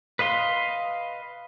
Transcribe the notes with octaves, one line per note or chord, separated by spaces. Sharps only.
B4 D#5 F5 C6